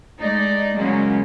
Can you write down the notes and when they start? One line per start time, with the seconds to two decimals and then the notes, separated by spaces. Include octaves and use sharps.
0.21 G#3 A3 D#4 D5
0.78 C#3 F#3 G#3 A#3 C#4